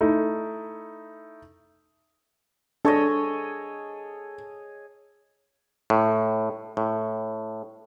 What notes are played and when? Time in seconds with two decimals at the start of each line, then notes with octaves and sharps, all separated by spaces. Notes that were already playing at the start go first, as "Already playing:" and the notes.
0.01 A3 D#4 E4
2.85 D4 G#4 A4 C#5 D#5
5.90 A2
6.77 A2